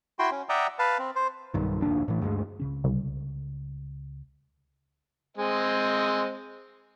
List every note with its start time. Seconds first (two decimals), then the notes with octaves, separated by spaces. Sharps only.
0.19 E4 F#4 G5 C6
0.31 C#4
0.49 D5 E5 F#5 G5 A#5 D#6
0.79 B4 F5 A5
0.99 C4
1.16 C5
1.54 B1 G2 D#3
1.82 F1 A#1 D#2 D4
2.08 A2 E3
2.21 D2 G2 G3 G#3
2.60 C#2 C#3 C#4
2.84 C2
5.38 G#3 C4 D#5